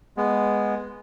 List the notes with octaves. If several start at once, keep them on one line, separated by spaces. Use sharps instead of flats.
G#3 B3